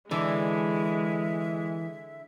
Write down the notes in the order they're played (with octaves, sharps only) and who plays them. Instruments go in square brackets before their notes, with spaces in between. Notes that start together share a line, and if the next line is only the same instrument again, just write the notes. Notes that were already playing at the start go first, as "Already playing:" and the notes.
[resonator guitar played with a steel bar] D3 [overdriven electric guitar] E3 [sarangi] G#3 [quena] E5